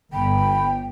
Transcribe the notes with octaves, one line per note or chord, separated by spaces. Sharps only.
G1 G5 B5